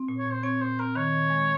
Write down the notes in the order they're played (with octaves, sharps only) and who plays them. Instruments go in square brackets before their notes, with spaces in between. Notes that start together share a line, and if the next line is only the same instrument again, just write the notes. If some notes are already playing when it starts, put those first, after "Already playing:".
Already playing: [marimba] C4
A#2
[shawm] C#5
[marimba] A#2
[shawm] C5
[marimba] C4 [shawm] C#5
[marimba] A#2 [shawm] C5
[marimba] C4 [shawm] A#4
[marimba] D#3 [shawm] C#5
[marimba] D#3
G#3